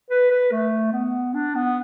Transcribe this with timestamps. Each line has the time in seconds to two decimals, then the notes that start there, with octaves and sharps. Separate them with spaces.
0.10 B4
0.31 B4
0.52 A3
0.93 B3
1.34 D4
1.55 B3